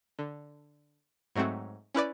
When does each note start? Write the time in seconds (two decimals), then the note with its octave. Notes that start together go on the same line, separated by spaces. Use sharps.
0.19 D3
1.35 G#2 F#3 A3 C4 F#4
1.94 C#4 E4 B4 D5